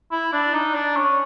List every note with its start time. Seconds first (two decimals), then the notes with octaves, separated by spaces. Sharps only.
0.12 E4
0.33 D4
0.54 D#4
0.75 D4
0.96 C#4